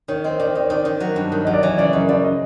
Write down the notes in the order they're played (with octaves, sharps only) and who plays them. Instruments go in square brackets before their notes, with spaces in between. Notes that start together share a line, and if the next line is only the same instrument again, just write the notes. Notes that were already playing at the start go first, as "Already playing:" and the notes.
[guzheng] D#3 [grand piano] C#5
[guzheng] C4 [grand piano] D#5
[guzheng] D#3 [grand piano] D5
[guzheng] D#3 [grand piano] D5
[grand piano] C#5
[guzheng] D#3 [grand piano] D5
[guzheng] D#3
F#3
G2
D#3
[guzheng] F#3 [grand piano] D#5
[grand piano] D5
[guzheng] E3 [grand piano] C#5
[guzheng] C#3 [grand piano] D5
[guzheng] F#2 [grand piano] D#5
[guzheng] F#2 [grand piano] D5
[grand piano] D#5